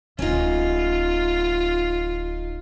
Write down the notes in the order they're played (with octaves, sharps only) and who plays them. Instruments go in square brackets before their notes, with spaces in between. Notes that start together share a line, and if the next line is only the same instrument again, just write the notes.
[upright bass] D1 [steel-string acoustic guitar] C#4 D#4 [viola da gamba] F4